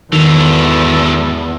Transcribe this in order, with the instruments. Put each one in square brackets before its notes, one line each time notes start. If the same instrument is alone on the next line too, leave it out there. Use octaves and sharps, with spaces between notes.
[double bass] E2 [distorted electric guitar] G#2 F#3 [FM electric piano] D#3 [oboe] A4